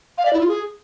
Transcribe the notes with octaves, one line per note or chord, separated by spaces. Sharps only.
F5
D5
E4
F4
G#4